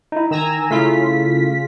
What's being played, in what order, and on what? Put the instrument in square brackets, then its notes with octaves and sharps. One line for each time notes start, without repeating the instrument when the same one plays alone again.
[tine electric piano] D#4 E4
[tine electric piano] D#3 [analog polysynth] G#5 A#5 E6
[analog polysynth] C#3 F4 B6 [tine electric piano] A3 E4